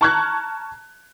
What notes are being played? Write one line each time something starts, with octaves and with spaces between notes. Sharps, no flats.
A5 A#5 C#6 F6 F#6 G#6